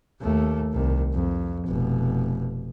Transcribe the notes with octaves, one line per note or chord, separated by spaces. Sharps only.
D#2 A3
C2 D#3
F2
F1 B2